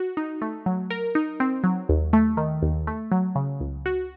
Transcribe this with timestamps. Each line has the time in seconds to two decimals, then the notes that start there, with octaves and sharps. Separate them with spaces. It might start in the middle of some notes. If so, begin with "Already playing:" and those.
Already playing: F#4
0.17 D#4
0.42 A3
0.66 F#3
0.90 A#4
1.15 D#4
1.40 C4
1.64 F#3
1.89 D#2
2.13 A3
2.37 D#3
2.62 D#2
2.87 A3
3.12 F#3
3.35 C#3
3.60 C#2
3.86 F#4